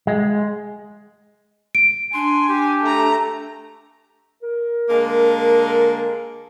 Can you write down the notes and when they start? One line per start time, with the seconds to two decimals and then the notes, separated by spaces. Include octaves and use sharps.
0.07 G#3
1.75 D7
2.14 D4 G#5 C6
2.49 G4
2.82 A3 A#5
4.43 A#4
4.89 D3 G#3 A#3